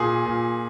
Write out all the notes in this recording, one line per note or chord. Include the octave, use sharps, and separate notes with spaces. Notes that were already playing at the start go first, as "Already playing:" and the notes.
Already playing: A#2 G#4
A#2